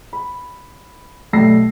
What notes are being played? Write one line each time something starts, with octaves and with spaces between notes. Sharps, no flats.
B5
B1 G3 A3 E6 A#6 C7